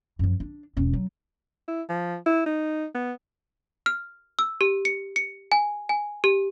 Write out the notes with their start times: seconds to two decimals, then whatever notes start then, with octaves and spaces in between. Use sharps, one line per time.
0.19 F#2 F3
0.40 D4
0.77 E1 C#4
0.93 F#3
1.68 E4
1.89 F3
2.26 E4
2.46 D#4
2.95 B3
3.86 F6
4.39 E6
4.61 G4
4.85 C#7
5.16 C#7
5.52 G#5
5.89 G#5
6.24 G4